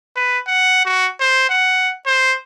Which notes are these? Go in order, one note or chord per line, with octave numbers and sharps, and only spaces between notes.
B4
F#5
F#4
C5
F#5
C5